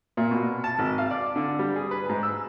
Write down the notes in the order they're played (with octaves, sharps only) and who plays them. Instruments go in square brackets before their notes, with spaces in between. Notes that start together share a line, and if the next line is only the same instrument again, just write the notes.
[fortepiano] A#2
B2
A5
G#1
F5
D5
D3
G3
G#4
B4
G#2
E6